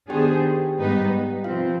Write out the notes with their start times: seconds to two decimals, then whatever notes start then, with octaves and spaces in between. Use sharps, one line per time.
0.10 D#3 B3 D4 G4 G#4 C5 G5
0.77 G#2 G3 B3 D#4 B4
1.44 C3 F3 C4 F4 F5